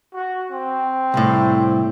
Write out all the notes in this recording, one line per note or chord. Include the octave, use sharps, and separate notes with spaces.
F#4
C4
C2 A2